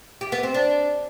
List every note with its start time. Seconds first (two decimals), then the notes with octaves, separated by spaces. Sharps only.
0.21 G4
0.32 B3
0.43 C4
0.54 D4